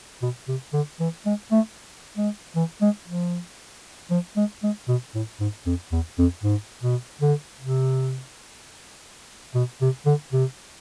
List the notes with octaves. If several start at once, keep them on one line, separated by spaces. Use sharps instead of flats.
B2
C3
D3
E3
G#3
A3
G#3
E3
G#3
F3
F3
G#3
G#3
B2
A2
G#2
F2
E2
F2
G#2
B2
D3
C3
B2
C3
D3
C3